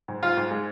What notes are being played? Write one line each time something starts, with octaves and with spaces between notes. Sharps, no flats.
G#2
G#2 F4
G#2
G#3